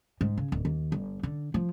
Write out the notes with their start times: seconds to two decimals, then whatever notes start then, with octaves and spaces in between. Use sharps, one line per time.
0.21 G#2
0.38 C#3
0.52 D1
0.65 D#2
0.92 G1
1.23 D3
1.54 F3